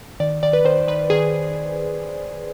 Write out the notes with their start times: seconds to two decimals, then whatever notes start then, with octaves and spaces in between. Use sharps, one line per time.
0.20 D#3 D5
0.43 D#3 D5
0.53 B4
0.64 D#3 C5
0.87 D#3 B4
1.10 D#3 G#4